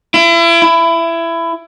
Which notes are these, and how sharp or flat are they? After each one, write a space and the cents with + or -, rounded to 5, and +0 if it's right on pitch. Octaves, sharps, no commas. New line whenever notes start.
E4 +35
E4 +20